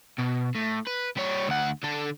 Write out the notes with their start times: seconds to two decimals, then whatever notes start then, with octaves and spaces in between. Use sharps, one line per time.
0.18 B2
0.55 A2
0.87 B4
1.17 G3 C#5
1.48 D2 F#5
1.83 D3 A4